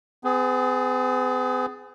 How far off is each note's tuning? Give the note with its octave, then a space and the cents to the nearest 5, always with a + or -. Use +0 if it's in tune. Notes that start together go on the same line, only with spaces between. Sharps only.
B3 +45 G#4 +0